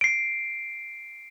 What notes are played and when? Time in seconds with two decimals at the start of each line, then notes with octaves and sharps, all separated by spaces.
0.01 C7 D7